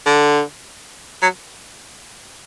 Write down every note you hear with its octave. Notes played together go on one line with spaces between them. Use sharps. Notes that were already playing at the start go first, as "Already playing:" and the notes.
D3
F#3